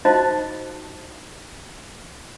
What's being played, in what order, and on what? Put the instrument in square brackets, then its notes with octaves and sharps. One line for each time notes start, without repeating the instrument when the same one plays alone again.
[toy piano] D#4 F4 F#4 C5 D#5 A5